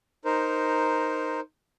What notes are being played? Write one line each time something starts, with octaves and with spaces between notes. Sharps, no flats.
D#4 A#4 C5